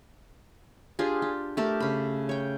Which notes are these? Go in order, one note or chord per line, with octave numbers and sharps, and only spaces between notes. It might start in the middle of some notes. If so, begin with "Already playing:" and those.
D4 F4 G4 G#4
G4
A3 G4 A4 A#4
C#3 B5
C#5 G5